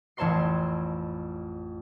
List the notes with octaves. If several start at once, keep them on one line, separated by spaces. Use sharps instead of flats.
A1 F2 C#5 A5 C6 C7